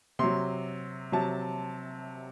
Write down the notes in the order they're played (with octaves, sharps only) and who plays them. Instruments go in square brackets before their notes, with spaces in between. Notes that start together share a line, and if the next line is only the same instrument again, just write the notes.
[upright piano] C3 F#3 C6
C3 F#3 A5